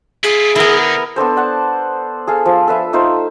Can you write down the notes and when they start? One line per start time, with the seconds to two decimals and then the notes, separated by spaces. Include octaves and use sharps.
0.24 E4 F4 G#4
0.56 D3 B3 E4 A#4
1.16 B3 D4 A4 C5
1.36 D5 F#5 A5
2.27 G#4 A4 F5
2.46 F3
2.68 A4 B4 E5
2.93 A3 D#4 F4 C5